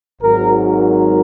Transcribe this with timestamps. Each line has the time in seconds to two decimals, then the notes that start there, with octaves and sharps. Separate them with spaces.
0.22 G#1 G#2 F#3 A#4
0.77 A#4